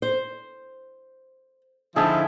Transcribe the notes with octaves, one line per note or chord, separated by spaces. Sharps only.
C5
D3 F3 D#4 E4 G#4 E5 A5